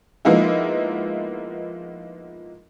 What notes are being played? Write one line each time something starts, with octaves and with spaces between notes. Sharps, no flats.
F3 G#3 A#3 B3 D#4 E4